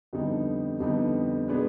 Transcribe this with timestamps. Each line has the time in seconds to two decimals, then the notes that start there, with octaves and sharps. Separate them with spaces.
0.13 F2 D3 G3 B3 D#4
0.80 F2 D3 G3 B3 D#4
1.47 B2 G#3 B3 D4